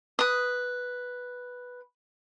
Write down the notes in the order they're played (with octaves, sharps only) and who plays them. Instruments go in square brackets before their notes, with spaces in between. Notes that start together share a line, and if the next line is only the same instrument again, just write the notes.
[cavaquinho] B4 D#6